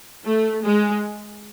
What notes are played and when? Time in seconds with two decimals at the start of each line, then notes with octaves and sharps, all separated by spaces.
0.25 A3
0.64 G#3